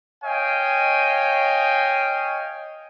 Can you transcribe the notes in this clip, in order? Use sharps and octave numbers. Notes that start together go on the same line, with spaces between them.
C#5 D#5 F5 G5 G#5